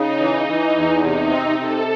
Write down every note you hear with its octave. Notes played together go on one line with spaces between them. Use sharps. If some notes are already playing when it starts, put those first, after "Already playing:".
Already playing: C#3 D#4
E3
E3
E2
C3 D#4
C4
C3 A4